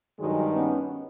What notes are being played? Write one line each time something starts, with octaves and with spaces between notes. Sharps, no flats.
G2 D#3 F#3 G#3
B3 C#4